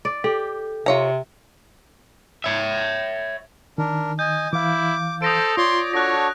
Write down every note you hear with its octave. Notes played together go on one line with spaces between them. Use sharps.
D5
G4 A4
C3 F4 C#5 A#5
C#5 E5
D#3 D4 A#4
D#5 G#5 G6
E3 E4 F5 D6
A4 C5 D#6 A#6 D7
F4 C#5 D5 C6 D6
D4 F#4 A4 C#5 F#6 A#6